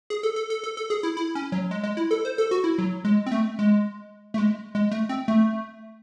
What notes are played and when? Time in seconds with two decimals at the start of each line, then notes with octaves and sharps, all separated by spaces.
0.10 G#4
0.23 A4
0.36 A4
0.50 A4
0.64 A4
0.77 A4
0.90 G#4
1.03 E4
1.17 E4
1.35 C#4
1.52 F#3
1.71 G#3
1.83 G#3
1.97 E4
2.11 A4
2.25 C5
2.38 A4
2.51 F#4
2.64 E4
2.78 F#3
3.05 G#3
3.26 C4
3.32 A3
3.59 G#3
4.34 A3
4.38 G#3
4.75 G#3
4.91 A3
5.09 C4
5.28 A3